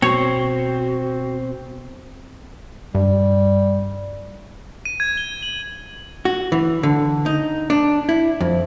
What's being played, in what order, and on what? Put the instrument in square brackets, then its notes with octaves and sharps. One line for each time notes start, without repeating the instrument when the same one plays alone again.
[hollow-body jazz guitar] B2 [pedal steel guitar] C4 C5 [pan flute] F#4 [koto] C#5
[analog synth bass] G2 [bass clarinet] G3
[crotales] D#7
G#6
G7
F#7
[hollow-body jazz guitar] F#4
E3
D3
D#4
D4
E4
F2